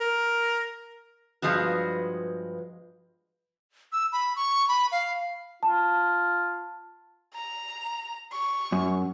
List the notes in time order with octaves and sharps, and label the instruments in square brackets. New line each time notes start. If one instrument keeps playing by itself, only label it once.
[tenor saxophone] A#4
[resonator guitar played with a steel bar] G2 B2 F3 G#3 B3 F#4
[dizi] E6
B5
C#6
B5
F5
[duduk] F4 [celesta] A5
[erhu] A#5
C#6
[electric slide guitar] F#2